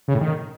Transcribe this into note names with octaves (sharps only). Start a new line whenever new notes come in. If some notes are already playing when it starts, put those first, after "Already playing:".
C#3
A2
D#3